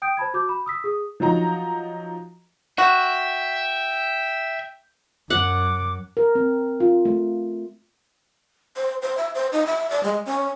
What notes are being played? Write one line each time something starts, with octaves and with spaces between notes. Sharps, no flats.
G5 D#6 G6 D7
C5 A5 B5 G#6
F#4 D6 G6
B5
D#6 E6 B6
G#4 D#6
F3 F#3 D#4 A#5
F#4 E5 G5
F#2 F#5 D6
A#4
C4
F4
A3
C5
C5
E5
C5
D#4
E5
D5
G#3
C#4